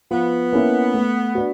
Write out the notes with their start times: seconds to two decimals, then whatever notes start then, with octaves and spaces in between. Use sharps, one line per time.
0.11 F3 B3
0.53 A#3 C#4 E4
0.94 A3
1.35 D4 F#4